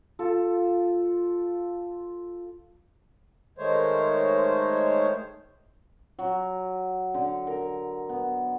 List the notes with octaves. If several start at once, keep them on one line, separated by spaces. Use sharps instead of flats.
F4 A4
D#3 G#3 A3 C5 C#5
F#3
D3
A#4
B3